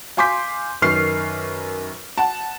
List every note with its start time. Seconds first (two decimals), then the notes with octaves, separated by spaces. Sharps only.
0.17 F5 G#5 C6 D6 G6 B6
0.82 F#2 D#3 B4 C#6 F6 C7
2.18 F#5 A5